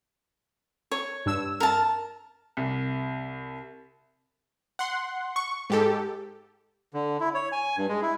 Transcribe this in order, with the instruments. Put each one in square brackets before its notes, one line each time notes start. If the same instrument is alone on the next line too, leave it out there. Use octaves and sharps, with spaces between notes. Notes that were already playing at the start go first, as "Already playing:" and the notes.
[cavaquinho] C#5
[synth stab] G2 E6
[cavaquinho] A#4 A5
[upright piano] C2
[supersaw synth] F#5 C6
C#6
G#2 G4 A4
[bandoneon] D3
E4
C#5
G#5
G2
G#3
E4